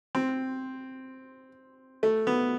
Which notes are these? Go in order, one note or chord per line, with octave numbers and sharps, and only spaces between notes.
C4
A3
B3